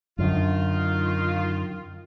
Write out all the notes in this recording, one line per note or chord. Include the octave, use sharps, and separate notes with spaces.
F#2 D3 D#3 F4